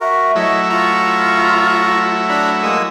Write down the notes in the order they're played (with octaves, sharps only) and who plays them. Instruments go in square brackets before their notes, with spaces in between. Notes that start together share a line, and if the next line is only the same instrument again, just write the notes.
[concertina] F#4 A#4 [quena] E5
[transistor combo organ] F#3 A3 E4 [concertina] C#5 D#5
[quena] F4 [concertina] A#5 C#6
[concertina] D4 A#5 B5
G#3 A#3 D#6